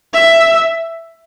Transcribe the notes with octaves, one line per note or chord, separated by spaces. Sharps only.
E5